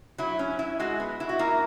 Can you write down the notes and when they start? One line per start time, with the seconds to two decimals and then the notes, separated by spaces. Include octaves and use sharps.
0.18 F#3 E4
0.39 C#4
0.59 E4
0.80 G#3 F#4
1.00 B3
1.20 E4
1.29 F#4
1.39 A#3 E4